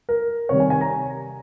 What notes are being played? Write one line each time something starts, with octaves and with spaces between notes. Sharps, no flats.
A#4
C3 D#3 G3 C#5
G#5
G#5
A#5